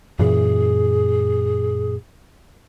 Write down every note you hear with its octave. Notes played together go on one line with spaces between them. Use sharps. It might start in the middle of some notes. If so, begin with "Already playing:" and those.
F#2 A#2 E3 G#4